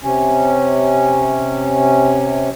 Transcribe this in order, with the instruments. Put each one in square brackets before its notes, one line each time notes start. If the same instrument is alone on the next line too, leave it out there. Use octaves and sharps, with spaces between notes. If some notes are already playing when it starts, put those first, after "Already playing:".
[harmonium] C3 C#4